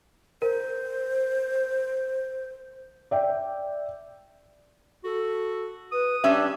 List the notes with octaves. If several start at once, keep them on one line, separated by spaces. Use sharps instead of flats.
A#4 C5
D5 E5 G5
F#4 A4
B4 D#6
G3 C#4 D4 E5